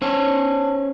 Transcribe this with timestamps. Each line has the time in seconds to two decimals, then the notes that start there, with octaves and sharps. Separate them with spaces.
0.02 C#4 D4 C5 C#5